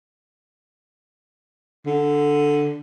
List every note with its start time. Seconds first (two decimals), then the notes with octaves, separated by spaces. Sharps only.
1.86 D3